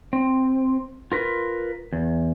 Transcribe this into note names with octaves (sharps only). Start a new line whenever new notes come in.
C4
F4 A#4 B4
E2